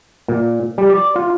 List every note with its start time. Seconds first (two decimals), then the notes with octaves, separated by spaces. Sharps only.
0.28 A#2
0.78 G3
0.90 D5
1.16 F4